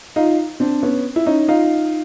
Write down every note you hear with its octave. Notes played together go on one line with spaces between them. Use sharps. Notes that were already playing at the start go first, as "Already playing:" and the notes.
D#4 F4
C4 D4
B3 C#4
E4
C#4 D#4
D#4 F4